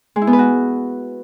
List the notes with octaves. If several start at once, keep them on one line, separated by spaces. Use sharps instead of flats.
G#3
E4
B3
B4
F#4